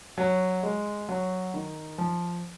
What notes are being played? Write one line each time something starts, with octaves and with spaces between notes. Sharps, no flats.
F#3
G#3
F#3
D#3
F3